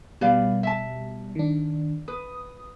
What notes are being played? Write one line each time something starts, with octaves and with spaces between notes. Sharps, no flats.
B2 G3 B4 D5 F5
E5 A5
D#3 D4
B4 D#6